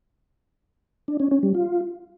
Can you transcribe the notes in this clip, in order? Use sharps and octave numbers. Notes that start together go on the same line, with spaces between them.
D4
C#4
C#4
G3
F4